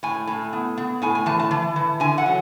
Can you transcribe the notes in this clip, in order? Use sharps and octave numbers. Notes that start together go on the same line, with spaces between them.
A2 G#5
A2
B3
B3
A2 G#5
G#5
E3 A5
A5
E3
E3
D3 G#5
F#5
F#3